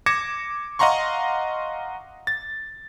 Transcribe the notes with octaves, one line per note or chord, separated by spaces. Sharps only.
D6 G#6 A#6 C#7 E7
D#5 F5 F#5 A#5 C6 C#6
A6